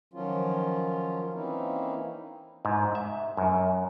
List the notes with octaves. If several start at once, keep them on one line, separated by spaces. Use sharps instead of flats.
D#3 F3 F#3 C#4 F4
E3 A#3 C4 C#4 D#4 E4
G#2
E5
F#2